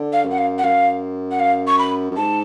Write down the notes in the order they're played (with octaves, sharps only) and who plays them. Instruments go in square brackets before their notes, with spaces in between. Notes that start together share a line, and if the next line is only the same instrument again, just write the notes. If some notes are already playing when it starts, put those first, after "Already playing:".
Already playing: [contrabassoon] D3
[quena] F5
[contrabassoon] F#2
[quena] F#5
F5
F#5
[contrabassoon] F#2 [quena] F5
[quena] F#5
F5
C#6
B5
[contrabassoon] F#2
[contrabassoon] G#2 [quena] A5